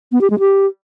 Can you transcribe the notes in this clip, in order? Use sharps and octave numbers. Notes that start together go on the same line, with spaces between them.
B3
G4
G#3
G4